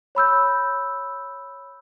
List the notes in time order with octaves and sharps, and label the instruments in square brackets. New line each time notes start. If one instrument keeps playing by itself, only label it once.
[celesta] C#5 B5 E6 G6